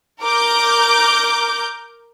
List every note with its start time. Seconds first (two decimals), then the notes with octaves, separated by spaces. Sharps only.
0.23 A#4 D6 G6